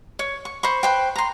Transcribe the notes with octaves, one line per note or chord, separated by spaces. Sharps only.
C#5
C#6
C5 B5 C#6
B4 C5 G5
A#5 C6